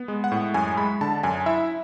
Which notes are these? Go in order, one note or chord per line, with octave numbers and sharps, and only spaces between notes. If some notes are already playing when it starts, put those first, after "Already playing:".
Already playing: B3
G#3
F#5
A2
F#2 G#5
G#3 B5
D3 A5
F#2 G#5
E4 E5